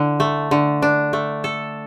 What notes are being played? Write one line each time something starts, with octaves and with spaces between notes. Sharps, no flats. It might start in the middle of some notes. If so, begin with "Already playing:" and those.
Already playing: D3 E4
A3
D3
D4
A3
A4